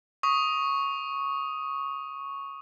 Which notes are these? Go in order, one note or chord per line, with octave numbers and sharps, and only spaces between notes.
C#6 D#6